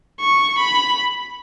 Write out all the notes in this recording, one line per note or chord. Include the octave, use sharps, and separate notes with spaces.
C#6
B5